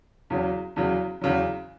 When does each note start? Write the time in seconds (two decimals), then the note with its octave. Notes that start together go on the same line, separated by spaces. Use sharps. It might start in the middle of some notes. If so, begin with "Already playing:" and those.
0.30 E2 C#3 F#3
0.76 E2 C#3 F#3
1.21 E2 C#3 F#3